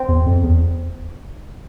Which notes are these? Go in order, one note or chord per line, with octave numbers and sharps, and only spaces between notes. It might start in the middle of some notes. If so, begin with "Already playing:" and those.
Already playing: C4
E2
F2
E2